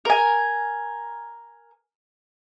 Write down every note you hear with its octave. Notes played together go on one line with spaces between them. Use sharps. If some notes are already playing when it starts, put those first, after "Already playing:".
A#4 G#5